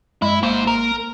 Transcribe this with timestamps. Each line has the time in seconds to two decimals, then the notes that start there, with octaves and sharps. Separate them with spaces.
0.22 G2 G#3 E4
0.43 G#1 G#2 A#3 C5
0.67 A#4